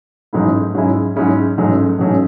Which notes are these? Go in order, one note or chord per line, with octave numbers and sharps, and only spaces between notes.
A1 G#2 F#3 A3 E4
G#2 F#3 C#4 E4 G#4
G#2 F#3 C#4 E4 G#4
A1 G#2 F#3 A3 C#4
A1 G#2 F#3 A3 C#4